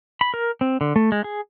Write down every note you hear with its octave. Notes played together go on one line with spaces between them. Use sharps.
B5
A#4
C4
D3
A3
G#3
G#4